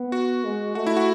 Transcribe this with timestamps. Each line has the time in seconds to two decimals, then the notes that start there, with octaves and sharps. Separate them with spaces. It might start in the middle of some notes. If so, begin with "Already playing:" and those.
Already playing: B3
0.12 F#4
0.44 G#3
0.75 A3 F#4
0.86 E4
0.97 F#4